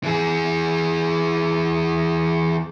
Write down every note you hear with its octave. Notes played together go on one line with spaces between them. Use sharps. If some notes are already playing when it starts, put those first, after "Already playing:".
E3 G#4